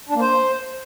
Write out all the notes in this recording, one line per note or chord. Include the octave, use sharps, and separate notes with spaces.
D4
A#3
C5